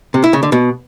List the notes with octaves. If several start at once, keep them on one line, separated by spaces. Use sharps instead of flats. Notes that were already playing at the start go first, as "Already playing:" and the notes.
C3
E4
C#3
D3
B2